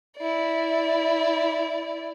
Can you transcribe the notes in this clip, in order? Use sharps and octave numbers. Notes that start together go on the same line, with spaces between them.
E4 D5